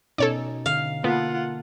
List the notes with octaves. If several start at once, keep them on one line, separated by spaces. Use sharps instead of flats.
B2 C#4 D#4 A4 C#5 D5
D3 F5
A#3 B3 F4 A4 F#5